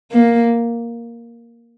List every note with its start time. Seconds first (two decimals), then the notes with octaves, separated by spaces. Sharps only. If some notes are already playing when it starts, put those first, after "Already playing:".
0.11 A#3